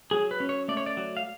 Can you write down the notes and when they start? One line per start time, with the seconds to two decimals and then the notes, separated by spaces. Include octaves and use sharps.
0.11 F#3 G#4
0.31 B4
0.40 C#4
0.49 C#5
0.68 A3 D5
0.77 C#5
0.86 D5
0.97 F#3
1.17 F5